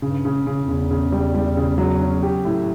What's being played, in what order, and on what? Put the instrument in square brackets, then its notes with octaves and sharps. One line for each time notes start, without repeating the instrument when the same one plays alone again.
[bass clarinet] G2 [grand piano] C#3
[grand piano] C#3
C#3
[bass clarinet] E2
[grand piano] C#3
C#3
G3
G3
C#3
F#3
C#4
G4
A2